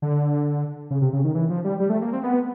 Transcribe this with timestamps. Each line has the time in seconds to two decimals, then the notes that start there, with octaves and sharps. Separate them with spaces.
0.02 D3
0.91 C#3
1.02 C3
1.13 C#3
1.24 D#3
1.35 E3
1.50 F3
1.64 G3
1.80 G3
1.90 A3
2.02 A#3
2.13 C4
2.23 B3